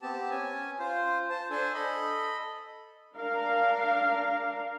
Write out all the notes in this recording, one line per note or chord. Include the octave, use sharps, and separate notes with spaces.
B3 C4 G4 A5
C#4 G#5
F4 C5
C5 A5
D4 A4 C5 G#5
A4 D#5 B5
D4 A#4 F5